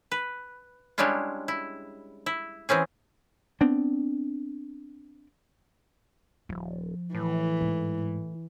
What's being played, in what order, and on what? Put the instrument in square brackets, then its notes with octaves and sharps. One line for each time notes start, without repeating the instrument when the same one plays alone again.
[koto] B4
G3 G#3 C#4 D4 E4 F4
E4
E4
E3 C4 C#4 G#4
[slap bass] B3 C4 D4
[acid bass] D#1 [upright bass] F3
[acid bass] A2 [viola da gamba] E3
[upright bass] G#2